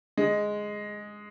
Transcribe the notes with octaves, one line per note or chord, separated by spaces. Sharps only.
G#3